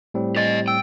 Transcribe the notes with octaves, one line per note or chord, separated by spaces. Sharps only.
A2 G3 C4
G4 D#5 A6
G5 E6